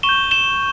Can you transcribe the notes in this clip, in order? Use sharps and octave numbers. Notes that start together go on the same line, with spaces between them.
C#6 E7 G7
G6
E7 G7